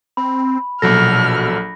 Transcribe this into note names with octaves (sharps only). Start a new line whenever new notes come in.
C4 B5
A#1 B2 F#3 A4 F6 A#6